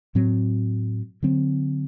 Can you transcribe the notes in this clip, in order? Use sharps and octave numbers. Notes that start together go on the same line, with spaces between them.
A2 F#3 C4
D3 F#3 C4